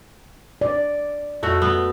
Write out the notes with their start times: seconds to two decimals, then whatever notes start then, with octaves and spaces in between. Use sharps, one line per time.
0.61 D5
1.43 F2 A3 F#4
1.62 B3